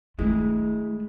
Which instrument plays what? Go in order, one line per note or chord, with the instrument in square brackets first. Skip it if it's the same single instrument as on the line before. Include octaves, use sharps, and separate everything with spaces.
[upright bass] D#3 A3 [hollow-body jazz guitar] G#3 E4